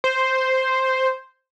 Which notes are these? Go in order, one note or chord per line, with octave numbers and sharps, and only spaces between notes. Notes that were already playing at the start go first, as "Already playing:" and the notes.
C5